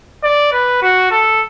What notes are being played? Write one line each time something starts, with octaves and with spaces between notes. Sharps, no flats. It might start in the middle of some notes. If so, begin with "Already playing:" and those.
D5
B4
F#4
A4